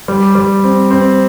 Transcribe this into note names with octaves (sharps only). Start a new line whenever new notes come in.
G3
G3
C4
C4